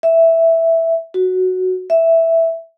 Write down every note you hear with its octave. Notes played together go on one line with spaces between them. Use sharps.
E5
F#4
E5